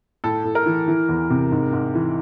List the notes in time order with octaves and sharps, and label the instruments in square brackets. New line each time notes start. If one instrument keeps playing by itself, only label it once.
[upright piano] A2 A4
A2
A#4
E3
E3
E2
C3
G#2
G#2
E3